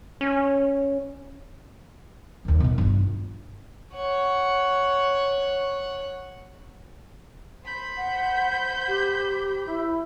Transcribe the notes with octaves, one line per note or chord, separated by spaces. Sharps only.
C#4
D#2 D#3
B2 D#3
G2 F4
C#5 F#5
C5 B5 G6
F#5
G4
E4